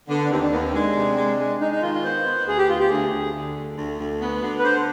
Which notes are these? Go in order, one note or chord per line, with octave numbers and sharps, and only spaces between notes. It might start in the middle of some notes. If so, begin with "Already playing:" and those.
D3 B3
D4
D#2 C4
D4
D#2 B3
C4
G#3 D4
C3
G#3
G#3
G#3 D#4
D#4
D#3 F4
F4
B3 C5
B3
D2 G#4
G4
D2 F4
G4
D2 G#4
D2
D3
D2
D2
D2
B3
D3
B4
D3 C5